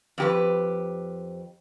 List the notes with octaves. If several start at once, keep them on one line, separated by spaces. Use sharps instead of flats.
F2 G4 B4